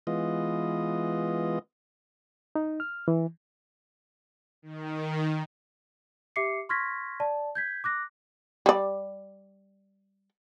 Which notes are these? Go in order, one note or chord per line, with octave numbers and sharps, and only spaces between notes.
E3 G#3 B3 F4 D#5
D#4
F6
E3
D#3
G4 E5 D6 C7 C#7
C6 C#6 F6 G#6 A#6 B6
D5 A5
G6 G#6 B6
D6 F#6 A#6
G3 D5